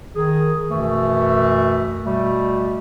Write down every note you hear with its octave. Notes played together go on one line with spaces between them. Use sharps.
D#3 G#4
F#2 B2 E3 A3
B2 G3 A3